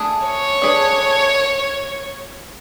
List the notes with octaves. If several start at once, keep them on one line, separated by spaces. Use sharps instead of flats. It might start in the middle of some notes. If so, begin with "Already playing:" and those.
Already playing: A3 D4 G#4
C#5
A3 D4 G#4 B4 D5